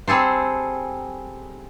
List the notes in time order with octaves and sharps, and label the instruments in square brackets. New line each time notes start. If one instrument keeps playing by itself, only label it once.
[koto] G3 C4 G#4 A4 C5